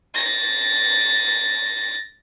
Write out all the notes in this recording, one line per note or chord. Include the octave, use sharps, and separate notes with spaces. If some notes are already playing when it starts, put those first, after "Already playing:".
A6 A#6